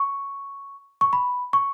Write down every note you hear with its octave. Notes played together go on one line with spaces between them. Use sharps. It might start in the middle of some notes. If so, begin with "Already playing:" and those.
Already playing: C#6
C#6
B5
C#6